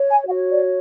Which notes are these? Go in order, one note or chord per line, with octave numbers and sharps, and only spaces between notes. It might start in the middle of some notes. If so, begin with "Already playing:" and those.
Already playing: C#5
G#5
F#4 F#5
C#5
D5